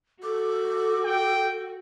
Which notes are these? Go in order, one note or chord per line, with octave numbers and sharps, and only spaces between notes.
F#4 A4 D6
G5